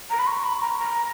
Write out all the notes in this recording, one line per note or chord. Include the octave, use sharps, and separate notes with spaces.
A#5
B5
C#6
B5
A#5
A#5